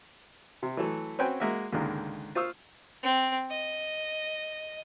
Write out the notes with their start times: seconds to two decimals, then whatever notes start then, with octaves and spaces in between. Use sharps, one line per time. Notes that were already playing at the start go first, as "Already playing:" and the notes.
0.63 C3
0.77 E3 F#3 A3 A4
1.19 C4 C#4 F#4 B4 G5 G#5
1.40 G#3 A#3 F#4 E5
1.72 C#2 G#2 D3 D#3 A#3
2.35 F4 C5 F5 C#6 D#6 E6
3.03 C4
3.50 D#5